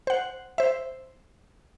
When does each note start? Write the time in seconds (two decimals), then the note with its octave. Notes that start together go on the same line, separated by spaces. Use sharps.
0.07 C5 F#5
0.58 C5 E5